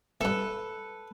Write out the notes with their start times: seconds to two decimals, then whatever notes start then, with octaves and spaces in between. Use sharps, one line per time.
0.21 G2 E3 A4 B4